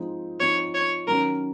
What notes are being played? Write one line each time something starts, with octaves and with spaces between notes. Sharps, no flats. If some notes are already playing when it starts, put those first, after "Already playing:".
Already playing: F3 G#3 C4 D#4
F3 C4 D#4 C#5
C#5
D#3 F#3 C#4 A#4